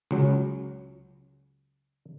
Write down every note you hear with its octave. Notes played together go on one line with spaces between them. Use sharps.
C#2 F#3